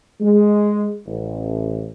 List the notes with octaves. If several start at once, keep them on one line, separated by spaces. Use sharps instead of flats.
G#3
A1